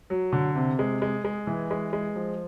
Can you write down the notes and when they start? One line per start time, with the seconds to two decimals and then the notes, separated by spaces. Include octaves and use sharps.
0.10 F#3
0.33 D3
0.55 C3
0.79 G#3
1.02 G#3
1.25 G#3
1.47 E3
1.71 G#3
1.93 G#3
2.16 F3